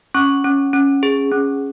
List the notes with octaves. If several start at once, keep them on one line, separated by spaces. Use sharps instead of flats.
C#4 C#6
C#4
C#4
G#4
C#4